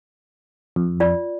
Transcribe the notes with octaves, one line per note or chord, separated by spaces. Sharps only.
F2
F4 D5